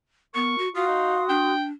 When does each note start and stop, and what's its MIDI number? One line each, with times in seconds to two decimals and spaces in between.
0.35 0.57 59
0.35 0.60 70
0.35 0.70 85
0.58 0.68 66
0.75 0.85 65
0.75 1.53 66
0.75 1.24 77
0.75 1.53 84
0.75 1.53 87
0.87 1.17 63
1.29 1.71 62
1.29 1.65 79